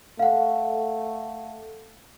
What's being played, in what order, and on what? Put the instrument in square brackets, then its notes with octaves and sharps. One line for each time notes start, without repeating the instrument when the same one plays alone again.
[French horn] A3 [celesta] F5 F#5